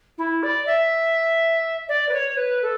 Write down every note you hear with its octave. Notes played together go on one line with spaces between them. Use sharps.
E4
D5
E5
D5
B4
C#5
B4
A4